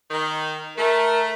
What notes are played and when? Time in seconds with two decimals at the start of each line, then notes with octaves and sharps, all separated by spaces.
0.11 D#3
0.78 A3 A#4